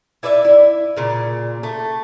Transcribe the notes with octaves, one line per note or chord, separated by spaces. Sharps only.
E4 B4 D5 E5
E4
A#2 C#3
A3